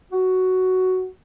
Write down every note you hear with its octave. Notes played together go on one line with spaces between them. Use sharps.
F#4